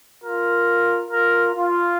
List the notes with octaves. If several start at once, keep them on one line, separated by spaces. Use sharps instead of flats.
F4 A#4
F4 A#4
F4